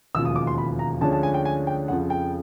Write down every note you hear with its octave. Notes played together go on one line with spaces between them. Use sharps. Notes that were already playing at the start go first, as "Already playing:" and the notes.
E1 D#2 C#3 F3 E6
D#6
D6
C6
B5
A#5
D2 D3 F3 G#3 C#4 A5
A5
G#5
G5
G#5
G5
F2 C#3 F3 F#5
G5